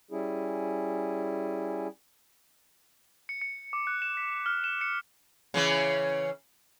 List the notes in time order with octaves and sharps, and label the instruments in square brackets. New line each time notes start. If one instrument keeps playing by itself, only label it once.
[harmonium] G3 C#4 E4 G#4
[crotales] C#7
C#7
D6
F#6
E7
B6
F6
E7
C#7
[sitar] C#3 E3 C#4